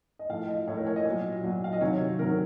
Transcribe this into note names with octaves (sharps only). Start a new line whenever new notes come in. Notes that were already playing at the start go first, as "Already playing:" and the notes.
D#5
A2 F3 F5
D#5
A2 F3 C#5
A#4
C#5
D#5
A#2 F#3
A#2 F#3
F5
D#5
C3 D#3 F#3 C#5
C3 D#3 F#3 A#4